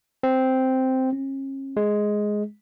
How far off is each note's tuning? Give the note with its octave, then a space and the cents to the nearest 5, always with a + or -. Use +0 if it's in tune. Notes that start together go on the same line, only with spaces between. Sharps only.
C4 -5
C#4 -40
G#3 +5